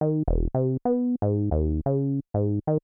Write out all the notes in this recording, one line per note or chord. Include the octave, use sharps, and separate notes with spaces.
D#3
E1
C3
B3
G#2
D#2
C#3
G#2
D#3